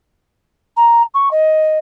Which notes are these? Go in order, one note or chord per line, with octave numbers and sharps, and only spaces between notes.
A#5
C#6
D#5